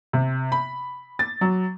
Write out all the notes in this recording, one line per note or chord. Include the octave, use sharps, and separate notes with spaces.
C3
B5
A6
F#3